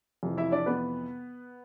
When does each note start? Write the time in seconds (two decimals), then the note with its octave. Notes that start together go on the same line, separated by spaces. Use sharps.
0.23 F2 C3 E3
0.37 E4 E5
0.52 D4 D5
0.66 B3 B4